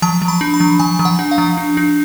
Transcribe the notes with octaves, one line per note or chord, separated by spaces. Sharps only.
F3 A5
F3
B5
D4
B5
F3
F3 G#5
F3
F#5
D4
F5
F3
D4
D4